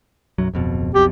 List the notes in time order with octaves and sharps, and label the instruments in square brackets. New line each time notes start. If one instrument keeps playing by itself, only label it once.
[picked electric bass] B1 F#2 F#3
D1 F2 B2
[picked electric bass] B1 F2 B2 [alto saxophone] G4